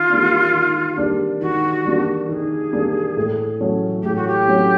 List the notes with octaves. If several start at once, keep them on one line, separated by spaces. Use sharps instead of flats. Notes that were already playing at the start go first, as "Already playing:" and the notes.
Already playing: D#3 F4
G3 A#3 D4
D#3
G3 A#3 D4
D#3 F#4
G3 A#3 D4
D#3 G#4 A#4
G3 A#3 D4
A2
F#3 A3 C#4
A2 G4
F#4
G4
F#3 A3 C#4